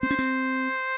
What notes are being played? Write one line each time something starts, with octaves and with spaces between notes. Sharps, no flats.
C4 C5
C#4
C4